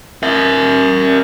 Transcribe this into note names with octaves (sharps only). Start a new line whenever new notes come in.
A#4 E5